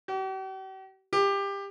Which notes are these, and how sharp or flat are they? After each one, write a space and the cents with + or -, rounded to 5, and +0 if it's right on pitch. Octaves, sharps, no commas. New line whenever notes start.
G4 -45
G4 +20